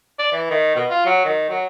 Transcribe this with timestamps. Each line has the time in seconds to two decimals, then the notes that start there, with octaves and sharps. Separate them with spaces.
0.19 D5
0.33 E3
0.50 D#3
0.76 B2
0.90 F4
1.05 F#3
1.25 D#3
1.50 F#3